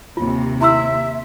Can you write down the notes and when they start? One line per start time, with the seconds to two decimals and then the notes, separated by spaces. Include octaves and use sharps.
0.17 D#2 C3 F4
0.61 E4 E5 C6 E6